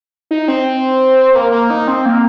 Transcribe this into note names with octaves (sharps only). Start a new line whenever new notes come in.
D#4
C4
A#3
A#3
D#4
C4
A#3